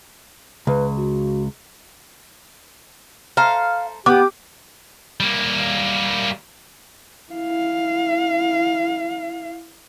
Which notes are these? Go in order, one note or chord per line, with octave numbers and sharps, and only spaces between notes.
C#2 B4
F#4
A4 C5 F5 A#5
B3 G4 D6
G3 A#3
E4 F5